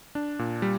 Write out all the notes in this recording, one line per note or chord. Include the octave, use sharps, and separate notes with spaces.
D4
A#2
G3